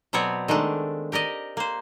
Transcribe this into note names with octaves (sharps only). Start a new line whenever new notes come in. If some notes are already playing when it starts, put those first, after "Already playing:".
B2 F#3 B3 C4 C#5 D5
D#3 G#3 A3 D4
G4 A#4 D5 D#5
A#3 C5